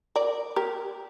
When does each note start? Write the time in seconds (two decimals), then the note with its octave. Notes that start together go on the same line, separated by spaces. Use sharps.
0.16 A#4 D5
0.56 G4 A#4